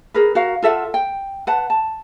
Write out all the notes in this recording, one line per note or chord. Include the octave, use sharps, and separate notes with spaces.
G#4 A#4 B4
F#4 A#4 F5
F4 A4 E5 F#5
G5
B4 F#5 A5
A5